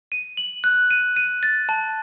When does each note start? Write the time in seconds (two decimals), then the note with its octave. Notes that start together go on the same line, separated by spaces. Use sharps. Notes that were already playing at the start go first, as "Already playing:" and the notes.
0.12 D#7
0.37 F#7
0.64 F#6
0.91 D#7
1.17 D#7
1.43 A6
1.69 A5